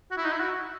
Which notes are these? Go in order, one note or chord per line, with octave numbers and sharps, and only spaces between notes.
F#4
E4
D#4
E4
F#4